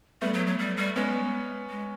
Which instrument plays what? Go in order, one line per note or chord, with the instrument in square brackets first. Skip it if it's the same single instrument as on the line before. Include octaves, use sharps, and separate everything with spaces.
[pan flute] G3 [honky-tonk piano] A3 B3
[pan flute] F#3
F#3
G3
G3
[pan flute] G#3 [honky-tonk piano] B3 C#4
[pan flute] G#3